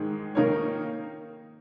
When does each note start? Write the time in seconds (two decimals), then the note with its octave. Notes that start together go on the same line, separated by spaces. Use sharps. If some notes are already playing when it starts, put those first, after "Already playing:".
Already playing: G#2 D#3 G#3
0.35 D#3 A#3 D#4 A#4 C#5